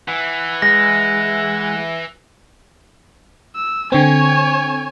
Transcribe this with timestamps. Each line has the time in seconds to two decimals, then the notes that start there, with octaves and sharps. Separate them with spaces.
0.08 E3 F#5
0.62 G#3 A#6
3.55 E6
3.92 D3 C4 C#5 G#5